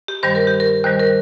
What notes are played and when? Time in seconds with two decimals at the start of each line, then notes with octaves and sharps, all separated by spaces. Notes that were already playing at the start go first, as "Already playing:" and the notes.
0.08 G4
0.23 G2 D#3 G3 C5
0.35 A#4
0.47 G4
0.60 A#4
0.84 D#2 D#3 G3 C5
0.99 A#4